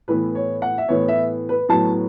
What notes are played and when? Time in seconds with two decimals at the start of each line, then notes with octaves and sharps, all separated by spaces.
0.08 A2 E3 B3 B4
0.35 C#5
0.62 F#5
0.78 E5
0.88 A2 E3 B3 C#5
1.08 E5
1.49 B4
1.69 A2 F#3 B3 A5